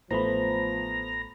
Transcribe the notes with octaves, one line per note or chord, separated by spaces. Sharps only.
A1 F3 A3 B3 C5 A#5 B5